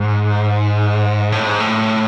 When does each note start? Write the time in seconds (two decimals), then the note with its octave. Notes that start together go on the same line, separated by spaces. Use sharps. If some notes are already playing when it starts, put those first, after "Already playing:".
Already playing: G#2
1.32 A2
1.46 G#2
1.60 A2